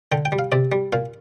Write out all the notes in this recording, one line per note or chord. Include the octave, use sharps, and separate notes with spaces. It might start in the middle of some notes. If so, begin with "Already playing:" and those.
D3 G5
G5
G3
F5
C3 D5
G3
A#2 F5